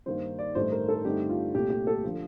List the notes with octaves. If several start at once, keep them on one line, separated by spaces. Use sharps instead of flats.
G2 D#3 A#3 D#4 C5
D5
A1 G2 D#3 A3 D#4 C5
A#4
A4
G2 D3 A3 C4 D#4 G4
F4
C2 A#2 A3 G4
G4
A4
D3 F3